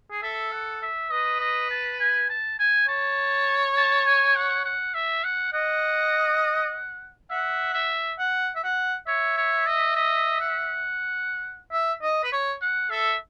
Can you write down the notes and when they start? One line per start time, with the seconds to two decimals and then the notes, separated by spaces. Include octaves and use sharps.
0.11 G#4
0.23 A4 E5
0.52 F#5
0.82 E5
1.11 B4 D#5
1.40 D#5
1.71 A5
2.00 G#5
2.29 A5
2.59 G#5
2.88 C#5 A5
3.77 A5
4.06 G#5
4.36 F#5
4.65 F#5
4.94 E5
5.24 F#5
5.53 D#5 F#5
7.30 E5 F#5
7.74 E5
8.19 F#5
8.56 E5
8.64 F#5
9.07 C#5 E5
9.37 C#5
9.67 D#5
9.96 D#5
10.41 F#5
11.72 E5
12.03 D#5
12.24 B4
12.32 C#5
12.62 F#5
12.90 A4 E5